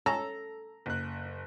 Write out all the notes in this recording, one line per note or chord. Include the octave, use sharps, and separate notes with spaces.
C#4 A4 A#5
F#1 F#6